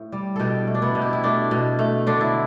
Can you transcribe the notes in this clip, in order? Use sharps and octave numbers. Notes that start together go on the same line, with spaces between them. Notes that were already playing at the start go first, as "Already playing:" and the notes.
Already playing: A2
G3
B2 D4 G4 A4
A3
D4
B3 E4
B2
G4
E4
A3 D4
B2
A3
D3 D4
E4